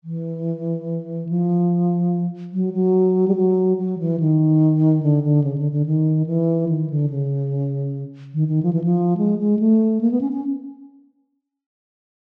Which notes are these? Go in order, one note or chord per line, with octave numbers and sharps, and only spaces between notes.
E3
F3
F#3
F#3
G3
F#3
F#3
E3
D#3
D3
D3
C#3
D3
D3
D#3
E3
D#3
D3
C#3
D#3
D#3
F3
E3
F3
G#3
G#3
A3
A#3
B3
C#4
C#4